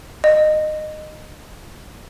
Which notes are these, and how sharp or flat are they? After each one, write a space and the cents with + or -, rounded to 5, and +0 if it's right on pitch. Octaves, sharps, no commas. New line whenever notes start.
D#5 -20